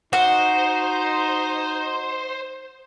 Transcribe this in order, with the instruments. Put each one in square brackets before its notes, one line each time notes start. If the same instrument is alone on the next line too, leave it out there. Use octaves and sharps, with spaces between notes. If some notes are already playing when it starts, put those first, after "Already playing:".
[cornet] D#4 [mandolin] F#4 [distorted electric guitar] C5